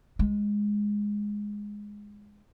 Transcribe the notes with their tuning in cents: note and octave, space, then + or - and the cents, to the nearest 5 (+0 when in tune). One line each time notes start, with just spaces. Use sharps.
G#3 -5